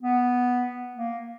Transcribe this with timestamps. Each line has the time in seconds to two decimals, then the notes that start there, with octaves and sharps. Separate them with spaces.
0.03 B3
0.96 A#3